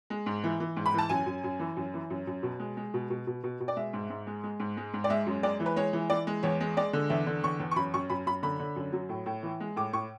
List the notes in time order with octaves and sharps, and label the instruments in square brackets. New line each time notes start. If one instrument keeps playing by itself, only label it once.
[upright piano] G#3
G#2
E3
E3
G#2
B5
E3 A5
F#2 G#5
F#2
F#2
E3
F#2
E3
F#2
F#2
B2
G#3
G#3
B2
B2
B2
B2
B2
D5
G#3 E5
G#2
G#2
G#3
G#3
G#2
G#3
G#2
D5
G#3 E5
F#2
G#3 D5
E3
B4
G#3 C#5
E3
E3 D5
G#3
E2 C#5
G#3
G#3 D5
D3
E2 E5
D3
E2 C#6
E2
C#6
F#2 B5
F#2 C#6
F#2 B5
F#2 B5
D3 B5
D3
F#2
F#3
A2
A2
E3
G#3
A2 D6
A2 C#6